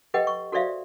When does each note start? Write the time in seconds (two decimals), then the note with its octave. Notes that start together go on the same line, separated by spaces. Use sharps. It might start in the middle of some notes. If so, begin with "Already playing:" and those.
0.14 G4 A4 B4 D#5 F#5 G5
0.27 C#6
0.52 F#4 A4 C5 D5 E5 F5